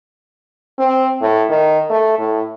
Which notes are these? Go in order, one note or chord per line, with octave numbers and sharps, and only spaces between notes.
C4
A2
D#3
A3
A2